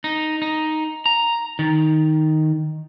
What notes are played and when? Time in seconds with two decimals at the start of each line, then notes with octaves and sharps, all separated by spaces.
0.04 D#4
0.42 D#4
1.06 A#5
1.59 D#3